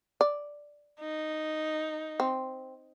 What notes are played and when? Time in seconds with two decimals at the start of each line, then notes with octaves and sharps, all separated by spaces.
0.21 D5
1.00 D#4
2.20 C4